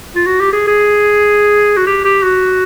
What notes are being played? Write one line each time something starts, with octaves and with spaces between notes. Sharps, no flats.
F4
F#4
G4
G#4
G#4
F#4
G4
G4
F#4